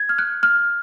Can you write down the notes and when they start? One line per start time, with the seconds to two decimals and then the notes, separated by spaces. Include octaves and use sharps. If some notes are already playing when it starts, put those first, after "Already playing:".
Already playing: G#6
0.09 F6
0.18 F#6
0.43 F6